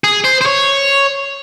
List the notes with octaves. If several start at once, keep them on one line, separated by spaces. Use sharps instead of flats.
G#4
C5
C5
C#5